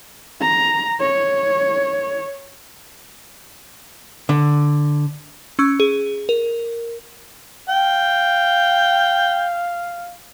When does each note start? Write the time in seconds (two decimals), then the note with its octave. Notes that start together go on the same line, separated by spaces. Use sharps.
0.41 A#5
1.00 C#5
4.29 D3
5.59 C#4 C#6 E6
5.80 G#4
6.29 A#4
7.69 F5 G5